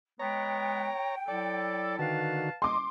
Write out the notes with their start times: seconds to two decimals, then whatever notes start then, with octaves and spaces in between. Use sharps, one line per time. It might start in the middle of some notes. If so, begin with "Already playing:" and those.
0.19 G#3 B3 C#5 G5 A#5
1.28 F#3 E4 A4 D5
1.99 D3 D#3 F#4 B4 F5 A5
2.62 D#5 C6 D6